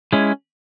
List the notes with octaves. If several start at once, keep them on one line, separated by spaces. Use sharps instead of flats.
G#3 C#4 E4